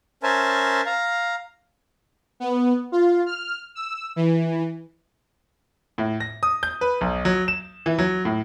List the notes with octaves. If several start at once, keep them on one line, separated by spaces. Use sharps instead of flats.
C#4 A#4 C5 E5 G#5 A5
F5 A#5
B3
F4
F6
E6
E3
A2
A#6
D#6
G6
B4
B1
F#3
E7
E3
F#3
A2